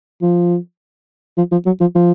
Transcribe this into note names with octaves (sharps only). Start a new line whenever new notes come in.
F3
F3
F3
F#3
F3
F3